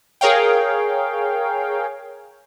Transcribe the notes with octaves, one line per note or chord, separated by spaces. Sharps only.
G#4 A#4 C#5 F5 G5